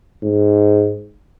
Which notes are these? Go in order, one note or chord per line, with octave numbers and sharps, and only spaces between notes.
G#2